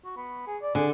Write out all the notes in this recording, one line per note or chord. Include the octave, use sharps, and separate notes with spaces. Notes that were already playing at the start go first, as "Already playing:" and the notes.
F#4
B3
G#4
D5
D3 G#4